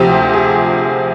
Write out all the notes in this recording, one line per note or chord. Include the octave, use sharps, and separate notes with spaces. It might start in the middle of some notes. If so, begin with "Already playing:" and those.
Already playing: D2 C3 F3 G4
G#4